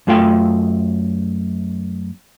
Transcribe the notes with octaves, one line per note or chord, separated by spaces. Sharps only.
F#2 A3 F4 F5 G5